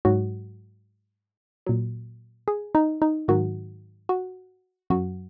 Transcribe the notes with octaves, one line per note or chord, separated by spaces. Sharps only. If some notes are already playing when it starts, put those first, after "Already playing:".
G#2 F#3 F#4
A#2 F#3
G#4
D#4
D#4
G#2 D#3 F#3 F#4
F#4
F#2 F#3 F#4